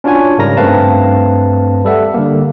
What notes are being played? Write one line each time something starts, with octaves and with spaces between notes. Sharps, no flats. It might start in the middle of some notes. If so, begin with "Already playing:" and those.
C#4 D4 F4 F#4 C#5 G#5
G#2 C#3 G3 A#4 A#5 A#6
G2 A3 C4 B4 F5 A5
G3 A4 E5 F#5
D3 G3 A#3